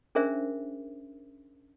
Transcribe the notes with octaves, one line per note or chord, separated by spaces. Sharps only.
C#4 D4 G#4 A#4 C5 E5